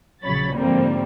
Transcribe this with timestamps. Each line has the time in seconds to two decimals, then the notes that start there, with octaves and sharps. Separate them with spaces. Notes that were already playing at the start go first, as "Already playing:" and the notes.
0.24 A#1 C#3 F#3 C#5 B5 A6
0.55 G#2 D3 F3 G3 A#3 C4